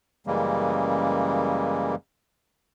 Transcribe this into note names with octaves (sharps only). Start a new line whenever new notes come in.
F#2 C#3 E3 G3 G#3 A#3